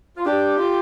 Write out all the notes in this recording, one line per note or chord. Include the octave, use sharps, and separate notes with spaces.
F4
D4 G4
F4